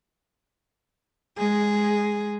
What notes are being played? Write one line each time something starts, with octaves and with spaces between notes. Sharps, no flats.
G#3 G#4